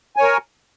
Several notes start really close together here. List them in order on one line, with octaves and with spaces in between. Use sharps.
G#5 C#5 A#4